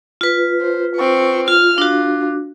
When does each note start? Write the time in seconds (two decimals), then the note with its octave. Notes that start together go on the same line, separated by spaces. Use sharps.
0.21 F4 B4
0.61 C5
0.96 C4 C#6
1.48 F4 F6
1.78 D4 F4 F#4